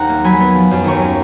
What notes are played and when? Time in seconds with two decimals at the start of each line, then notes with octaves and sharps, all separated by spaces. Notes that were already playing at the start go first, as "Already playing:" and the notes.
Already playing: D#2 F#5 A#5
0.09 A#3
0.24 F#3 G#5 B5
0.40 B3
0.55 F3
0.71 F#2
0.84 D#2 A#5 C#6
1.02 C#4